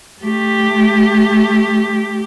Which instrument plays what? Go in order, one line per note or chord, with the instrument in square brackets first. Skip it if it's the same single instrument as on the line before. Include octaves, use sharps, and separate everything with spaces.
[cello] A3 G4